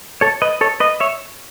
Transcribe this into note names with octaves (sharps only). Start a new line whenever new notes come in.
A4 C#5
B4 D#5
A4 C#5
B4 D#5
C#5 E5